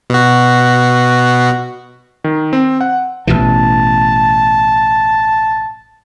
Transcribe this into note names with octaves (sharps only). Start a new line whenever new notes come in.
B2 F#4
D#3
C4
F#5
A1 B2 E3 A5